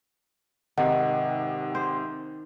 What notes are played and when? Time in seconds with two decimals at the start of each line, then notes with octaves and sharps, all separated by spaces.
0.78 G#1 C3 D#3 F#5
1.75 C5